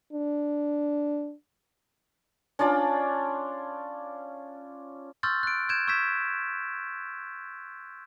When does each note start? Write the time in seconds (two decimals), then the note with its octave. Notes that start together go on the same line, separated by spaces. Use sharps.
0.13 D4
2.59 C#4 D4 F4 D5
5.23 C6 C#6 E6 F6 G6 A6
5.43 F#6 D7
5.69 G6 G#6 D7 E7
5.87 C#6 E6 G6 G#6 B6 E7